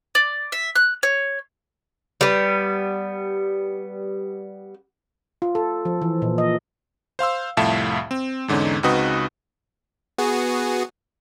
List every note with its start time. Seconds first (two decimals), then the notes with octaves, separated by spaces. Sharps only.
0.15 D5
0.52 E5
0.75 F#6
1.03 C#5
2.21 G3 B3
5.42 F4
5.55 A4
5.85 F3
6.02 E3
6.22 A#2
6.38 D#5
7.19 C5 F5 C6 E6
7.57 C2 F2 A2 E5 F5 A5
8.11 C4
8.48 E2 G#2 D3 C#4 D#4
8.83 C#2 C4 D#4 F#4 B4 D#6
10.18 B3 F#4 G#4